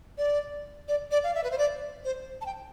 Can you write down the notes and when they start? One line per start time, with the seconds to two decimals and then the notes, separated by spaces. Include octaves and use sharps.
0.18 D5
0.88 D5
1.11 D5
1.24 F5
1.35 E5
1.44 B4
1.51 C5
1.58 D5
2.05 C5
2.41 A5
2.46 G5